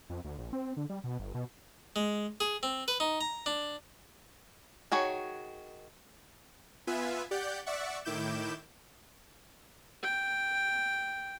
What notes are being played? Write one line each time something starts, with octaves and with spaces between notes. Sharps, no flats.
F2
D2
A#1
C4
D3
G3
B2
G1
B2
G#3
G#4
C4
B4
D#4
A#5
D4
D#3 F#4 G#4 C#5
B3 F4 B4 E5 G#5
G4 D5 F#5 G6
D5 E5 F#5 C#6
A2 D#3 E4 D6 G6 E7
G5